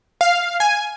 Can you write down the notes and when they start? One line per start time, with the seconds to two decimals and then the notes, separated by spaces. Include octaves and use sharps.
0.21 F5
0.60 G#5